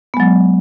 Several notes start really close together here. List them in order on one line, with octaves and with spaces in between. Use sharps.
B3 G#3 F#3